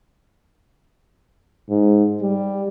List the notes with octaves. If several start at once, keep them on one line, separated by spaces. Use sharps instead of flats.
G#2
G3